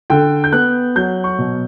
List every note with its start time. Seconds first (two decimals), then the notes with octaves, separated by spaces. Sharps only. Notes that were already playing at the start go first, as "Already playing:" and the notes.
0.10 D3 G5
0.44 G6
0.53 B3 F#6
0.96 F#3 G6
1.24 C#6
1.38 B2